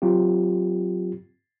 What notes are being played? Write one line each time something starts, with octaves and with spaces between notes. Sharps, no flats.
F#3 C4 F4 G4